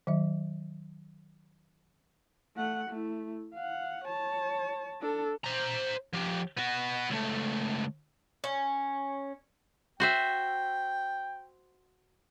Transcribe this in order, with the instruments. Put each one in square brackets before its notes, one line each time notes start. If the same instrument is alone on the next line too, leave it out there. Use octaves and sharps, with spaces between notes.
[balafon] D#3 F#3 E5
[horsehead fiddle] A3 F#5
A3 E4
F5 F#5
C#5 A5
D4 A4
[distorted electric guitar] C5 A#5
F3 G4
B3 F#4
C#2 A3
[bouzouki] C#4
[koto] F#4 C5 E5 [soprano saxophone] G5